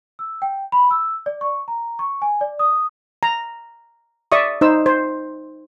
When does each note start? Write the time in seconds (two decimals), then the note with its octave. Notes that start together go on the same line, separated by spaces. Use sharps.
0.19 E6
0.42 G5
0.72 B5
0.91 E6
1.26 D5
1.41 C#6
1.68 A#5
1.99 C#6
2.22 G#5
2.41 D5
2.59 D#6
3.23 A#5
4.32 D5 E5 C#6 D#6
4.61 D#4 C5 E6
4.86 C5